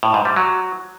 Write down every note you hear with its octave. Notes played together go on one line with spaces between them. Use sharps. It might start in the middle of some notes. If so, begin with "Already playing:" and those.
A2
G#2
G3
F#3